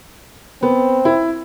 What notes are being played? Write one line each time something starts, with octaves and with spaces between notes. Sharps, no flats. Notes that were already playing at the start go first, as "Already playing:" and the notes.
B3 C4
E4